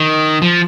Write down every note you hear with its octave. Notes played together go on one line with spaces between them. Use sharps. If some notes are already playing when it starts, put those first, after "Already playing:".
Already playing: D#3
F3